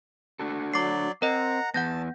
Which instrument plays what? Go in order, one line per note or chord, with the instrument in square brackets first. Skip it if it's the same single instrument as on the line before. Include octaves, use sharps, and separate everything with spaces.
[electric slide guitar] D4 F#4 A4
[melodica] F#3 D5 [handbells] D6 C7
[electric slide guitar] C4 [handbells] A#4 D#5 [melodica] F#5 A#5
[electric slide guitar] E2 B3 [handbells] F#5 G6 A#6 [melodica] A5